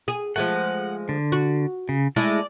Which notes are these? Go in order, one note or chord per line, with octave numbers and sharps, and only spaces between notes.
G#4
F3 G#3 A3 F#5
D3
F#4
C#3
G#3 A3 E4 D5